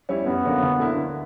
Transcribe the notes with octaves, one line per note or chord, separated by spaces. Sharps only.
G3 C#4 E4
F#2 B3
D3 F#3 A#3
D2
D3 A#3 E4
D3